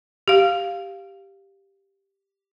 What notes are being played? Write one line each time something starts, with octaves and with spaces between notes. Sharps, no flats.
G4 F5